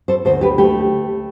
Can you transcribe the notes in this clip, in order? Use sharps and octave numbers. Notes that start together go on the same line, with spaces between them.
A4 C5
D2 A4 C5
G4 B4
A3 G4